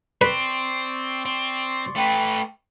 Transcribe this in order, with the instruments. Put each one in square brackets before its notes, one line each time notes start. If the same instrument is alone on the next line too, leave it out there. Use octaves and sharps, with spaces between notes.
[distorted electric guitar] C4 [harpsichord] B4 [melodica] D5 C6 C#6
[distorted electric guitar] C4
[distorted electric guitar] A3 B4 [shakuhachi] G5